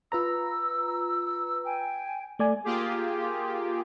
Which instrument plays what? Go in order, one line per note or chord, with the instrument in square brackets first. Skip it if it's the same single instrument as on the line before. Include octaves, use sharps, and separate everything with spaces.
[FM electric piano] F4 B4 A#5 [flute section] E6
[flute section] G5 G#5
[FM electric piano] A3 D5 G#5
[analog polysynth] A#3 F4 G4 G#4